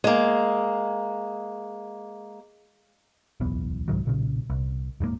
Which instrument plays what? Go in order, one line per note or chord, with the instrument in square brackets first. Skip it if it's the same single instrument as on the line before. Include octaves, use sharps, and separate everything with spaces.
[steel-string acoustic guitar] G#3 A#3
[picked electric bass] D1 B1 E2 B3
C2 G#2 D#3 F#3
B1 A#2 C#3
C2
D#1 G#2 C3 A#3